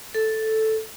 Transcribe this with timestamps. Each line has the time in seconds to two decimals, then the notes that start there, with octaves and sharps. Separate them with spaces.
0.15 A4